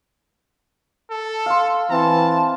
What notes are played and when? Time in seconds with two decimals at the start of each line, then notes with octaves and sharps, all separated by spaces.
1.10 A4
1.46 F5 C6
1.90 E3 C4 A5